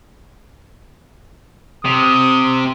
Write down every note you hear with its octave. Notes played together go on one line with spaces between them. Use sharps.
C3 D#6